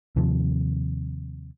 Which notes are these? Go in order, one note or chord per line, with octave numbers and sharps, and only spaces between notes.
D#2 C3 F3